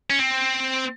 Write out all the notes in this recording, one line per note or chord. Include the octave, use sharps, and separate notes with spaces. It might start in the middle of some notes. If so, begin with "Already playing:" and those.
C#4
C4